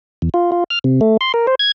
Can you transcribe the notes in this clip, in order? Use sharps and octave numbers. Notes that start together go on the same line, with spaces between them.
E2
F4
F4
F6
C3
A3
C6
A#4
C5
G#6